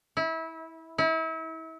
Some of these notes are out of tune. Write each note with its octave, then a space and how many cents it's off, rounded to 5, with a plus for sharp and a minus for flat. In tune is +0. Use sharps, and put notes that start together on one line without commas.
E4 -25
E4 -35